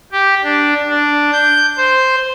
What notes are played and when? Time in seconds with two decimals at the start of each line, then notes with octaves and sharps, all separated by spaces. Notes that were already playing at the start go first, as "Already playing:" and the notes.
0.12 G4
0.44 D4
0.89 D4
1.33 G6
1.77 C5